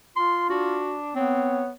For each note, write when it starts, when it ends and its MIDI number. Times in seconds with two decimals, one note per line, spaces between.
0.16 0.81 65
0.16 0.46 84
0.50 1.14 62
0.50 0.96 66
1.16 1.71 59
1.16 1.61 60
1.16 1.69 73